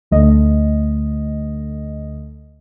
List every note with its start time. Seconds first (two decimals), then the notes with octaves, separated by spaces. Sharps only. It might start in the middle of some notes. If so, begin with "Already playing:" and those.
0.11 D2 D3 A3 D#5